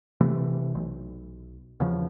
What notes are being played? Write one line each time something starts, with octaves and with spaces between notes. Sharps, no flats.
C3 E3 A3
B1
E2 C#3 F3